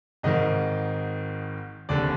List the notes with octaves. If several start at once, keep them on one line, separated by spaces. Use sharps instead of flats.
G#1 G#2 D#3 D#5
F1 D#2 D3 D5